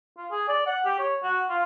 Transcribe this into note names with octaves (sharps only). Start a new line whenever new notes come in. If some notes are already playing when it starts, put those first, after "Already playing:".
F4
G#4
D5
F#5
G4
C#5
F#4
F4